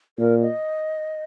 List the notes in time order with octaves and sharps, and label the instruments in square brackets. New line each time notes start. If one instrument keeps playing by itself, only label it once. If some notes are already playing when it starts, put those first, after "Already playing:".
[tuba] A#2 [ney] A#4
[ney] D#5